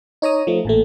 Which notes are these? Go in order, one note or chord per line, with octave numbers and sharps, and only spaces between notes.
D#4 C#5 A#5 D#6
F3 A3
A1 A#2 A3